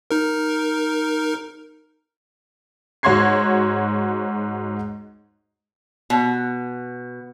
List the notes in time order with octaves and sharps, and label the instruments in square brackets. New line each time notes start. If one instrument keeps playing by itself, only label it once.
[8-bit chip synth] D#4 A#4
[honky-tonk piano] G#2 F#4 C#5 C6 G#6 C7
[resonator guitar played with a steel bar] B2